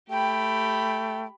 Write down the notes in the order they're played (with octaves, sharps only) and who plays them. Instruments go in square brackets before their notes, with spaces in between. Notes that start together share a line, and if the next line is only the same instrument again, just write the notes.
[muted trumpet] A3 [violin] G4 B5 [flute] G5